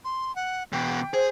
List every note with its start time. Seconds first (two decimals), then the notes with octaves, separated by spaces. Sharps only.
0.04 C6
0.35 F#5
0.72 E2 B2 G5
1.14 G#4 C5